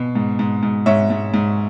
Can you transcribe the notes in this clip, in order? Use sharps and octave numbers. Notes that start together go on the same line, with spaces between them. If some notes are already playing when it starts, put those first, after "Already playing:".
Already playing: B2
G#2
G#2
G#2
G#2 C#5 E5
G#2
G#2